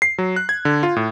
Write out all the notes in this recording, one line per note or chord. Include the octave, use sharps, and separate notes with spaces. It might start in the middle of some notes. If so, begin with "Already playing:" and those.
C7
F#3
F#6
G#6
D3
F4
A2